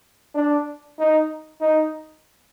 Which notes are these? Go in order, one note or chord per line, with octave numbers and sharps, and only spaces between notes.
D4
D#4
D#4